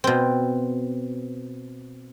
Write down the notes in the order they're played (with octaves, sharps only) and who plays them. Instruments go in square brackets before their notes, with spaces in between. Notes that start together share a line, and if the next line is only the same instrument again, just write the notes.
[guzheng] B2 C4